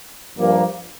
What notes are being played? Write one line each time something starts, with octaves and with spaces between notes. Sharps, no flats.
G2 F3 A#3